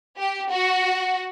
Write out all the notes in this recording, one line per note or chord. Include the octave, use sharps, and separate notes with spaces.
G4
F#4